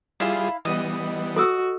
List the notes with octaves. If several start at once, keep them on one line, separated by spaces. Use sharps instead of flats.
G3 E4 F4 G#4 F5 B5
E3 G3 B3 D#5
F#4 A4 D#6 E6